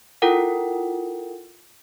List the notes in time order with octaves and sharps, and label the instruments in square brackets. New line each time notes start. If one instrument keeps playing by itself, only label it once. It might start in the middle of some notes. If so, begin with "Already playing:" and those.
[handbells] E4 F4 A4 A#4 F#5 G5